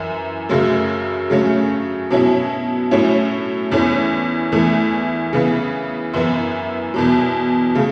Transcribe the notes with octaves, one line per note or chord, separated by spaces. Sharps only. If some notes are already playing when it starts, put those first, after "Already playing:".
Already playing: F#2 E3
F#2 C#3 F#3 A3
C#3 F#3 A3 C#4
B2 F#3 C#4 E4
A2 F#3 C#4 E4
E2 E3 A3 C#4
E2 E3 A3
C#3 E3 B3
F#2 E3 B3 E4
E2 B2 F#3
C#3 A3